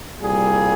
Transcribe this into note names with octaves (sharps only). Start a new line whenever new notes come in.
C2 A#2 G3 A#3 G#4